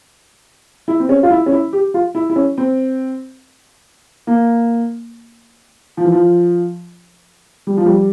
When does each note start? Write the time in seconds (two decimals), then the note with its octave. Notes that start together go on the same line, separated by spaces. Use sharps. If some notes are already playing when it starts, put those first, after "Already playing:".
0.88 E4
1.00 C4
1.09 C#4
1.23 F4
1.30 E4
1.46 C#4
1.52 E4
1.73 G4
1.94 F4
2.15 E4
2.30 E4
2.36 C#4
2.58 C4
4.27 A#3
5.97 F3
6.05 E3
6.12 F3
7.67 G3
7.77 F3
7.86 G3